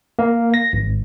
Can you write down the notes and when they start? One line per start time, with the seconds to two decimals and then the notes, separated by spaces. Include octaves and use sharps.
0.19 A#3
0.54 A#6
0.73 G#1